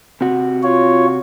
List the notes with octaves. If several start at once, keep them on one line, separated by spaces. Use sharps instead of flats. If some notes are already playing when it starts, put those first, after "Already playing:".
C3 F#4
F4 C#5